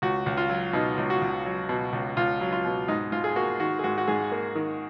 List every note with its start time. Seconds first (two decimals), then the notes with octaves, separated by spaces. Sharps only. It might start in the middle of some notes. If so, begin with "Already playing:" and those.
0.02 C#2 F#4
0.26 C#2
0.37 F4
0.49 F#3
0.73 B2 D#4
0.97 C#2
1.10 F#4
1.22 C#2
1.46 F#3
1.69 B2
1.93 C#2
2.17 C#2 F4
2.41 F#3
2.52 F4
2.65 B2
2.88 G#2 D#4
3.12 G#2 F4
3.24 G#4
3.36 A#3 F#4
3.60 D#3 F#4
3.79 G#4
3.84 G#2 F#4
3.98 F#4
4.07 G#2 G#4
4.32 A#3
4.55 D#3